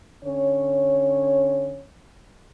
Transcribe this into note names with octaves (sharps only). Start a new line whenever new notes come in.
D3 C#4 C#5